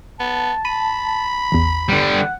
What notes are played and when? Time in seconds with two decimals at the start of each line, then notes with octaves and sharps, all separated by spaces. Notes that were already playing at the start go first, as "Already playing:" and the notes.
0.20 B3 A5
0.65 B5 D#7
1.52 A1 E2
1.89 D3 G3 B4 F#5
2.05 F#5